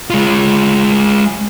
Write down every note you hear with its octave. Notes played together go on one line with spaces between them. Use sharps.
G#3 F4